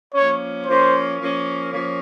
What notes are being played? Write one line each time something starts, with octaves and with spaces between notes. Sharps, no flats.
F3 A#3 C#4 C#5
F3 A#3 C#4 C5
F3 A#3 C#4
F3 A#3 C#4